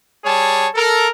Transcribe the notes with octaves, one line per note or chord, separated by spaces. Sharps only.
G3 G#4 C#5 A5
A4 A#4